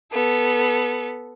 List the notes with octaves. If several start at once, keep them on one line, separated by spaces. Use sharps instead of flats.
B3 A4